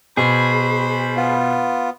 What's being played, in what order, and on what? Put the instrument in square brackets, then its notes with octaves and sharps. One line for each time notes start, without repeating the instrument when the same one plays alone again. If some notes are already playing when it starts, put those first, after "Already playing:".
[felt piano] B2 [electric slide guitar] G#4 [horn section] C5 B5
[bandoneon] B3 F4